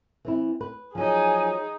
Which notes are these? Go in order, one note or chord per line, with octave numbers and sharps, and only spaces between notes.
E3 C4 E4
B4
F3 F#3 D#4 G#4 G#5